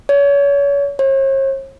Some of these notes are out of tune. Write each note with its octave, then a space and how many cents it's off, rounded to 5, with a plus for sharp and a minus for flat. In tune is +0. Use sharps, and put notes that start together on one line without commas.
C#5 +35
C#5 -45